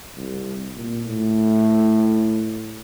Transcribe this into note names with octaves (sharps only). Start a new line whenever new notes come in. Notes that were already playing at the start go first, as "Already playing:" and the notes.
C2
A#2
A2